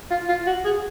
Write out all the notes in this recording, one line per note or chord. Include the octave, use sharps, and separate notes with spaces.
F4
F4
F#4
G#4